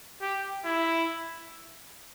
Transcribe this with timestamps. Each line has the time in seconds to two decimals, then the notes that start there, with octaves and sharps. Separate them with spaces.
0.21 G4
0.65 E4